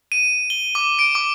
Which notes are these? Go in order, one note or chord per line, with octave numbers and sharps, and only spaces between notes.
D#7
G7
D6
D7
D6